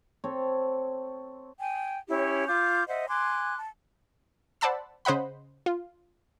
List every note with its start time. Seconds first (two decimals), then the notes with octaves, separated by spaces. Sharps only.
0.24 C4 A4 C#5
1.60 G5 G#5
2.09 C#4 E4 G4 C#5
2.47 F4 D6 G6
2.88 C5 D#5 E5 F#5
3.09 G#5 C6 D6 F#6
3.58 A5
4.61 C5 D5 F#5 A5 B5 E6
5.05 C#3 C5 D#5 F#5 B5
5.66 F4